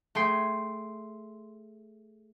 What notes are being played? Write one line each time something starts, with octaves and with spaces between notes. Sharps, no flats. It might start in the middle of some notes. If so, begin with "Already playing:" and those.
A3 G#4 G5 C6 C7